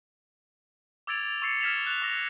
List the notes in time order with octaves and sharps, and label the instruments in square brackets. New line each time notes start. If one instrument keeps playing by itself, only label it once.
[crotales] D6 E6 G#6 A6 D7 F7
C#6 E6 A6 C7 C#7
F6 G#6 B6 E7 F7
F#6 F7
D6 E6 A#6